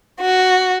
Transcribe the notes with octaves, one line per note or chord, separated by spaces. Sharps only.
F#4